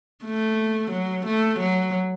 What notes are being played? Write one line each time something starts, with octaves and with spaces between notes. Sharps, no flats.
A3
F#3
A3
F#3